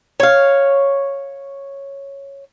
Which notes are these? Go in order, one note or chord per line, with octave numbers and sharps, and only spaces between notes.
C#5 F5